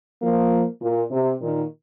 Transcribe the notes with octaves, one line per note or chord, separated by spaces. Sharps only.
F3 A#3
A#2
C3
A#2 D#3